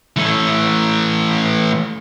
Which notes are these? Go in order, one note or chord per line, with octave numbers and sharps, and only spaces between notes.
E3 A3